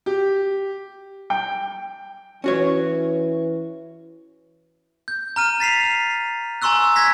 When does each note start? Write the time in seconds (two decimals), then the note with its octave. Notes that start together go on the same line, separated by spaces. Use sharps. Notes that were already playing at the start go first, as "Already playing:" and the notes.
0.06 G4
1.30 G5
2.44 E3 C#4 F#4 C#5
5.08 G6
5.36 A#5 F6 D#7
5.60 A6 B6 C7 F7
6.62 G#5 A#5 C6 C#6 E6 F#6
6.96 G#6 A#6 B6